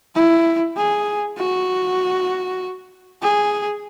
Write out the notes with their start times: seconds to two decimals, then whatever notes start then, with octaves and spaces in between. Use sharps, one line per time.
0.15 E4
0.77 G#4
1.38 F#4
3.22 G#4